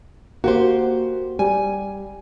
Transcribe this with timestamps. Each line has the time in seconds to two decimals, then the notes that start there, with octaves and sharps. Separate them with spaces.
0.44 A#3 F#4 G4 C5
1.39 G3 G#5